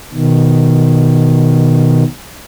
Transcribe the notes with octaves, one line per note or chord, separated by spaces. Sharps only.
B2 D#3